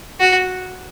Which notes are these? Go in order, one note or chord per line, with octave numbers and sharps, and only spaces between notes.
F#4